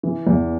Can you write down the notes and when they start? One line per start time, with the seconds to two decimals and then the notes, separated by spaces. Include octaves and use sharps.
0.03 E3
0.27 E2